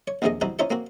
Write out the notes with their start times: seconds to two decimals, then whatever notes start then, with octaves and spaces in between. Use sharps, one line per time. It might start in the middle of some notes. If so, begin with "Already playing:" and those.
0.08 C#5
0.22 A#1 D#2 C3 F3 G#4 D#5
0.41 E3 G3 C4 D#4 F#4
0.59 C#4 D#4 F4 C5 C#5 E5
0.70 A#3 C4 F#4